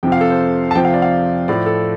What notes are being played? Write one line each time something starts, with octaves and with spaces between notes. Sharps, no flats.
F2 C3 F3 G5
F5
A4
C5
A5
F2 C3 F3 G5
F5
D5
F5
A2 F3 D5
A4